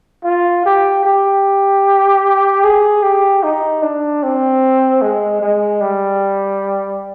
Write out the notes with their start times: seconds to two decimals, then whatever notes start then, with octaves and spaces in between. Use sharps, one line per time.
0.25 F4
0.66 G4
1.05 G4
2.64 G#4
3.03 G4
3.44 D#4
3.83 D4
4.23 C4
5.02 G#3
5.42 G#3
5.81 G3